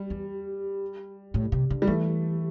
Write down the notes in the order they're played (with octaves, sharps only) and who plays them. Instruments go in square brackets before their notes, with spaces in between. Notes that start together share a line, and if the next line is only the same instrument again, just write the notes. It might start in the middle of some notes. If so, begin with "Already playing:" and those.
Already playing: [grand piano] G3
[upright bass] E2
A2
C3
D3
[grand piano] G3
[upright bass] E3 [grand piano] A3